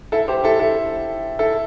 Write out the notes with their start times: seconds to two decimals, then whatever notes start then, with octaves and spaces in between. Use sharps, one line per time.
0.12 E4 A4
0.28 G4 C5
0.44 E4 A4
0.59 E4 A4
1.39 E4 A4